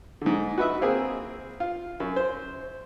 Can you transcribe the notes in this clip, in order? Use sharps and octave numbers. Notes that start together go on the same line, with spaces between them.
G#2 D3
F#4 B4 D#5 E5
A#3 C4 G#4
F4
F#2
C5